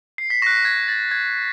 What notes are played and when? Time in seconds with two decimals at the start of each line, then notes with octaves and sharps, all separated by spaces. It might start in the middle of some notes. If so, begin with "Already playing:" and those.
0.18 C7
0.30 B6
0.42 C#6 F#6 A#6
0.65 G#6
0.88 A6
1.11 G#6